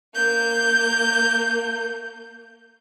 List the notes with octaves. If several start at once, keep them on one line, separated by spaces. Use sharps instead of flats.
A#3 G6